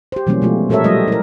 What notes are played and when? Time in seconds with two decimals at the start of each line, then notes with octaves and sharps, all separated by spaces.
0.12 G4 C5
0.27 B2 E3 F#3 G3 A#3 C#4
0.42 B2 F3 G#3 A3 F4
0.69 A#2 G4 A4 A#4 C#5 E5
0.84 F#3 G3 A3 F4 C5 D#5
1.08 E4 A#4